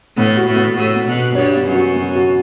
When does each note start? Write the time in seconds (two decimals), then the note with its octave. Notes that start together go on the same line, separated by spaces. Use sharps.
0.17 A2 B3
0.37 F#4
0.47 A2
0.56 B3
0.76 A2 F#4
0.96 B3
1.06 B2
1.16 B3
1.35 G2 C#5
1.56 B3
1.66 F#2
1.75 F#4
1.95 B3
2.15 F#4